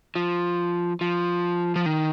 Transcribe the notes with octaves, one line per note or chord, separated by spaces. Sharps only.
F3
F3
F3
D#3